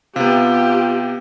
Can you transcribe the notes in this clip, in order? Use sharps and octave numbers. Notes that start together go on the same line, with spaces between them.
C3 B3 F4 G4